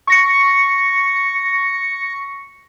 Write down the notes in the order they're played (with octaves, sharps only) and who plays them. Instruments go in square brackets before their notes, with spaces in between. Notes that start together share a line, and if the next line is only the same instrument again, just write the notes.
[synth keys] C#6 A#6 C#7